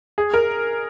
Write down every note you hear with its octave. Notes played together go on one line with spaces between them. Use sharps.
G#4
A#4